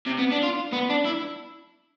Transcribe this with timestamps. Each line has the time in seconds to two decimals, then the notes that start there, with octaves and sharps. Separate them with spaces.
0.06 C3
0.18 B3
0.31 D4
0.43 F4
0.73 B3
0.90 D4
1.06 E4